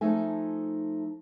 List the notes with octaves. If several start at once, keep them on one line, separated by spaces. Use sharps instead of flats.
F3 A3 D#4 E5 G#5